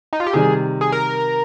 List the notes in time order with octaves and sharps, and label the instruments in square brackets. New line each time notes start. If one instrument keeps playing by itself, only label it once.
[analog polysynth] D#4
F4
G4
[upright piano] C3 D#3 G3 [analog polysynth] G#4
[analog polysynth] G#4
A#4